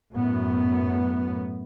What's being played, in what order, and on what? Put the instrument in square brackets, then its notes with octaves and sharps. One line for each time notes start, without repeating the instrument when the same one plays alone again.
[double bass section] F#2 A2 B3